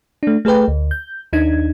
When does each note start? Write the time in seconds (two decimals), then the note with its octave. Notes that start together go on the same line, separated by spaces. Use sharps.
0.23 A3 D4
0.45 A3 G#4 A4 B4 G5
0.68 D2
0.91 G6
1.33 D#2 D4 D#4 G#6